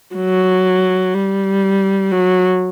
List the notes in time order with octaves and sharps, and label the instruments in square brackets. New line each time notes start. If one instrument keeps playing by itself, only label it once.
[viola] F#3
G3
F#3